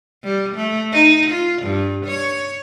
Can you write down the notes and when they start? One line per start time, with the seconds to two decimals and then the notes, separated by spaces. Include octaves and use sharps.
0.24 G3
0.56 A3
0.92 D#4
1.31 F4
1.62 G2
2.05 C#5